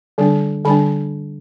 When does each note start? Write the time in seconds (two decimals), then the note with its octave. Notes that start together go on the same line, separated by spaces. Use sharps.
0.18 D3 G3 D4
0.65 D3 G3 D4 B5